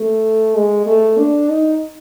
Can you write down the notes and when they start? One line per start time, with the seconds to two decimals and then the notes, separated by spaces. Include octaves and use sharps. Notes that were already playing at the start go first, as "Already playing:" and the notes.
Already playing: A3
0.55 G#3
0.86 A3
1.18 D4
1.49 D#4